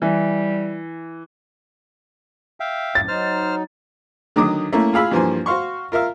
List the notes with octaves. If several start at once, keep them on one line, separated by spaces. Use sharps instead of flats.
E3 G3
E5 F5 G5
F#2 A2 A6
F#3 D#4 C5 F6
D3 D#3 F#3 D#5 D6 D#6
A3 A#3 C#4 E4
F4 G#4 F5 B5 E6
G2 E3 F3 A#3 C5 G#5
F#4 C5 F5 C6 C#6
F4 A#4 E5 F5